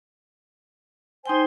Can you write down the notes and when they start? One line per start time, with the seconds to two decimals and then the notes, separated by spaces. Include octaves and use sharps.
1.26 D#4 C5 G5 G#5